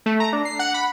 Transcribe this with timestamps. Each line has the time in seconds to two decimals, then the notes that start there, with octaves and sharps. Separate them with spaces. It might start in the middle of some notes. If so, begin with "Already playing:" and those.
0.06 A3
0.20 A#5
0.33 D4
0.45 C7
0.59 F#5
0.74 B5